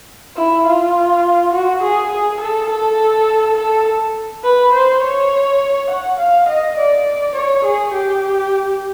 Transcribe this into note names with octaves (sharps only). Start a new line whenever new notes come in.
E4
F4
F#4
G#4
G#4
A4
A4
A4
B4
C5
C#5
F#5
F5
D#5
D5
C#5
G#4
G4